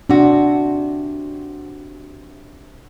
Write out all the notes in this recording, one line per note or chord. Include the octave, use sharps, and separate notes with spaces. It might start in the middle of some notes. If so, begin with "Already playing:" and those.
C3 D4 F#4